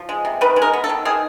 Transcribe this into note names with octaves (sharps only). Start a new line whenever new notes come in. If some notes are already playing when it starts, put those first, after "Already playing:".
Already playing: F3
G#3
C3
D#3 B4
G#3
A#4
B3
A4
D#3
D#3 G#4